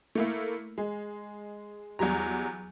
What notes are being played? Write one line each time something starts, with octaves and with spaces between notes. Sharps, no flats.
A3 A#3 E4
G#3
E2 F#3 G3 A#5